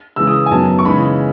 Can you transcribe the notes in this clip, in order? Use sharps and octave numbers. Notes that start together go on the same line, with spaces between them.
C#3 E3 G#3 E6
D#6
G#5
F#2 D#3 F#3 B3 A5
C#6
C#3 E3 G#3 D#4 B5